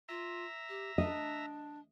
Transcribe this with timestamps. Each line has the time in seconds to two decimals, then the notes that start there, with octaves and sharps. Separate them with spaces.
0.09 F4 E5 A#5
0.69 G4
0.98 D4 D#5